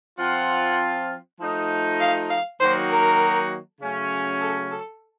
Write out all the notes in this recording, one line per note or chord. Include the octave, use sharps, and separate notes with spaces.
F3 C4 F4 F#5
F3 A3 D#4
F5
F5
D#3 F#3 A#3 D#4 F#4 C5
A#4
C#3 F#3 A3 C#4
A4
A4